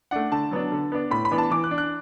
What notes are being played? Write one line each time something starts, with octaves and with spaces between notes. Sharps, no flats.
A3 D4 F#5
D3 A5
F#3 B3 D4
D3
B3 D4
A2 B5
B5
E3 B3 D4
A5
E3 D6
F#6
D4
F#6